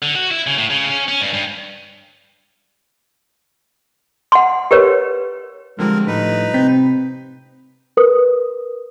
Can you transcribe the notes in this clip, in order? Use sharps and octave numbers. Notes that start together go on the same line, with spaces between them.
D3
F#4
E4
C#3
A2
C#3
C#4
C#4
G2
G2
F#5 C6
G4 A#4 B4 C#5
D3 F3 G3 G#3 C4 A#4
A2 D#4 B4
C3 C4 G6 B6
A#4 B4 D#6